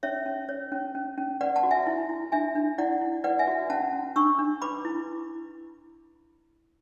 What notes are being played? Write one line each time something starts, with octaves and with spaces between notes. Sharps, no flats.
C#4 C#5 E5
C#4
C#5
C#4
C#4
C#4
B4 D5 F#5
F#5 A5
F#4
E5 G#5
E4
E4
D4 E5 G#5
D4
E4 D5 F#5
E4
B4 D5 F#5
E5 G#5
F#4
C#4 F#5 A5
C#4
D4 C#6 E6
D4
B4 B5 D6
E4